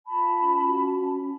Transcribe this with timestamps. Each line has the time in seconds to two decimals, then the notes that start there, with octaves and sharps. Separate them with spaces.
0.07 F4 A5 B5
0.38 C#4
0.67 F#4
0.98 C#4